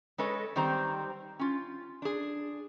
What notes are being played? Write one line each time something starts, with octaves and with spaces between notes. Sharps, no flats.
G#3 A4 B4 C#5 D#5
D#3 G3 C4 C5 A#5
C#4 F4
D4 G#4